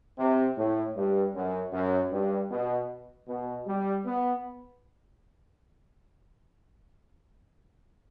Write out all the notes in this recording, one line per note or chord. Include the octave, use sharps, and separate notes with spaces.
C3
A2
G2
F#2
F#2
G2
B2
B2
G3
B3